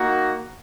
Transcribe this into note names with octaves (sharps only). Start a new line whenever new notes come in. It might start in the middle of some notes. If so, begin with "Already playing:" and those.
Already playing: A#3 D#4 F#4